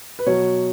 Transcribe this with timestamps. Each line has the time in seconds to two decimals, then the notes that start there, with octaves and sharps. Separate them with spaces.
0.19 B4
0.26 B2 F#3 C#5